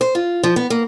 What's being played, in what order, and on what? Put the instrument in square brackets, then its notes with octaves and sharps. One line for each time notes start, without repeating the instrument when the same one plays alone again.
[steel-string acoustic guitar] C5
F4
F3
B3
A#3